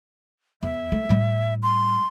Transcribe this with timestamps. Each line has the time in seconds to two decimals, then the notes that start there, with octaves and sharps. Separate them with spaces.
0.63 E2 E5
0.92 A3
1.09 A2 G3
1.63 C6